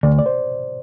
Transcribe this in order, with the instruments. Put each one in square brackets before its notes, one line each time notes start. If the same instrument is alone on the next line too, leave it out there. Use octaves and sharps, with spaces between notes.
[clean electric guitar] D2 [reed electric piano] D5
[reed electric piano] D5
C5